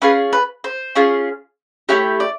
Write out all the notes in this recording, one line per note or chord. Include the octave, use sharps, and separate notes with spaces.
C#4 F4 G#4 B4
B4
C5
C#4 F4 G#4
A3 C#4 E4 G4 C#5
D5